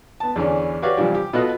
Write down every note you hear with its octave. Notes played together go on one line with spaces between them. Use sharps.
B3 A5
E2 D3 E3 C#4
F#4 G4 B4 C#5 D5 F5
G2 C3 E3 F3 G3
G4
B2 B3 F4 A4 D#5 F#6